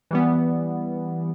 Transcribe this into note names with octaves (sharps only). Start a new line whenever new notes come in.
E3 G3 B3